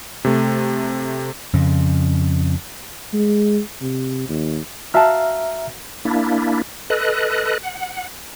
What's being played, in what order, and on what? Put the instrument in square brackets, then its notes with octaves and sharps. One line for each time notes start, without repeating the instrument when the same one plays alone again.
[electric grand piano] C3 A3
[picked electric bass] F2 C#3
[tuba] G#3
C3
D#2
[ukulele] F#4 F5 A5 [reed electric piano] E5 A#5 F6
[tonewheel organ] A#3 D4 E4
A4 B4 D#5 F#6
F#5